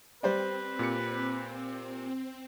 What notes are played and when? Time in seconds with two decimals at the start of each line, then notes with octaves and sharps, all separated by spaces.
0.23 G3 C4 B4 C5 D5
0.79 A#2 G4 C#7